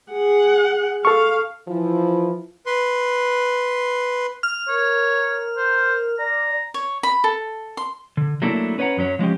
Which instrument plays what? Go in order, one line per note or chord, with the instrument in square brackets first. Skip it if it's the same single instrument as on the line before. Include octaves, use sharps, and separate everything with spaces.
[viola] G#4 F#5
[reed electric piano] A4 C#6 [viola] F5
[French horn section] E3 F3 E4
[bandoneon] B4 C6
[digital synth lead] F6
[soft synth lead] A#4 [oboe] C#5
[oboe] C5
[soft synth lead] D5 [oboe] A#5
[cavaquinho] C#5
B5
A4
C6
[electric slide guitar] D3
F#3 A3 A#3 D4 E4
C#4 B4 C#5 D#5 F#5 A#5
F#2 F#3 C#4 C#5
F3 G#3 C#4 G4